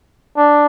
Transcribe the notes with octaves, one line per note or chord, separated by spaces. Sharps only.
D4